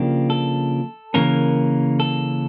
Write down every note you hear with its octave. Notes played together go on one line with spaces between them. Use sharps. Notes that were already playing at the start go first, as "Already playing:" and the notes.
Already playing: C#3 F3 A#3 D4 G4
A4
C#3 E3 A#3 C#4 A#4
A4